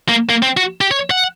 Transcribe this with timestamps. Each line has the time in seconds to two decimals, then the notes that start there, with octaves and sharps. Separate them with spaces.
0.09 A#3
0.30 A#3
0.42 C4
0.57 F#4
0.81 G4
0.91 C#5
1.10 F#5